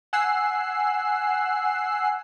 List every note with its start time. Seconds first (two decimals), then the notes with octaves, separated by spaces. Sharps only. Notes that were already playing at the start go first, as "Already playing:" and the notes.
0.13 F#5 G#5 E6 F#6 C7